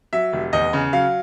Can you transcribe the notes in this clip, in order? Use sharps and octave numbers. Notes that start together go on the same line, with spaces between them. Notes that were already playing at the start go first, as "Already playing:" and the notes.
F#3 E5
F1
E2 D#5
C#3
F#3 F5